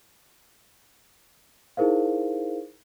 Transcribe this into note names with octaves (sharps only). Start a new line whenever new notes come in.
D#4 E4 G#4 A#4 C5 F5